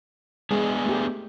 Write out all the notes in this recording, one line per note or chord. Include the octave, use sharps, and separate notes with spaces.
G#3 B3 D4 G#4
A3 G4